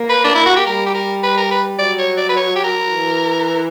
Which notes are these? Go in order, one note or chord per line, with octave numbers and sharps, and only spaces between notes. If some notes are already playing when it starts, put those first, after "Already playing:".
Already playing: A#3
B4
D4
E4
F#4
G4
G3 A#4
G4
A#4
B4
A#4
B4
F#3 D5
C#5
D5
B4
C#5
G4
A#4
E3